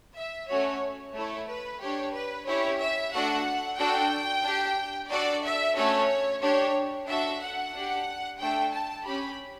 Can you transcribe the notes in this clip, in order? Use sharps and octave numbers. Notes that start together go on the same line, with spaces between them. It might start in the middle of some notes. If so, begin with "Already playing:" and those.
E5
A3 C#4 F#4 C#5
A3 E4 A4 C#5
B4
D4 G4 C#5
B4
C#4 E4 G4 C#5
E5
A3 D4 F#4 A4 F#5
D4 F#4 A4 G5
D4 G4
D4 F#4 A4 D5
E5
A3 C#4 F#4 A4 C#5
D4 G4 C#5
D4 F#4 A4 E5
F#5
D4 G4
A3 D4 A4 G5
A5
C#4 G4 B5